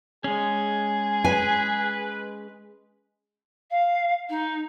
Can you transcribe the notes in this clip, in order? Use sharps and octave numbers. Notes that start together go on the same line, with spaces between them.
G#3 C#4 G#4
B4 G#5
F5
D#4